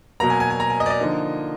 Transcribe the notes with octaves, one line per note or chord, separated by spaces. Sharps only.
B2 F#3 A#3 A#5
G#5
G#5
G#5
A#5
G#5
D#5
D5
D#5
D3 F3 A#3 D#4